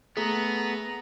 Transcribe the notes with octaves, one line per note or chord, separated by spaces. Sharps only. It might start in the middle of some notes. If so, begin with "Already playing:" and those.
A3 B3 G#4 A#5